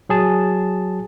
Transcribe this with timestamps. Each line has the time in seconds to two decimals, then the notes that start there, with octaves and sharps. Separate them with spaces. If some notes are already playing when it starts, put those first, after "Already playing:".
0.09 F#3 G#4 A5